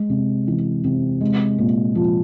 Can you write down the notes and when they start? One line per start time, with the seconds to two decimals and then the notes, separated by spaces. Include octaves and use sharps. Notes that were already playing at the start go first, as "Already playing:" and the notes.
Already playing: G#3
0.10 C3
0.48 E3
0.84 C3
1.21 G#3
1.58 A#2
1.95 F3